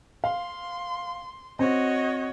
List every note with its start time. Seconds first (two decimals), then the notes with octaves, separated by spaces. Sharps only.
0.24 F5 C6
1.59 C4 F#4 C#5 D#5